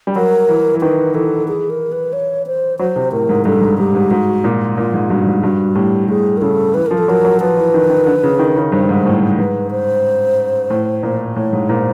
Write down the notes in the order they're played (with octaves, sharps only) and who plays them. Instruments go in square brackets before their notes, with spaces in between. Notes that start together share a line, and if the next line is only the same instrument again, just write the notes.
[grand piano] G3
[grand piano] F#3 [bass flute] A#4
[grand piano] E3
E3
[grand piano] D#3 [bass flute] B4
[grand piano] E3 [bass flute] A4
[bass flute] G#4
A#4
B4
C#5
C5
[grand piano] F#3 [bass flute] C5
[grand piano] C3
[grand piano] A2 [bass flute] A#4
[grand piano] G#2
[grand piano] G2 [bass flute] A4
[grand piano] G#2
[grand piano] G#2 [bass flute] G4
[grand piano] G#2
[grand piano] G#2 [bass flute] F#4
[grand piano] A#2
[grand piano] A#2 [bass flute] F4
[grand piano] G#2
[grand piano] G2 [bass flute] F#4
[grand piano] G#2
[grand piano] G2 [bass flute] F#4
[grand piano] A2 [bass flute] G4
[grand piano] A2 [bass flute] G#4
[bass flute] A#4
[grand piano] C#3 [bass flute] A4
[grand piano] E3 [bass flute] B4
[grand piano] F3 [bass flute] A#4
[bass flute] A4
[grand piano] F#3 [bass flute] A#4
[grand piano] F#3
[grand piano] F3 [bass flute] B4
[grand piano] E3
D#3
D#3
D3
C#3
D#3
C#3
[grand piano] G2 [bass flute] C5
[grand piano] G#2
[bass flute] C5
[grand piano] A2
G#2
[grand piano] G#2 [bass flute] B4
[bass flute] C5
[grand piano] A2
A#2
[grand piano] A2 [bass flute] C#5
[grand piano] G#2
[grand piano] A#2 [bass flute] C5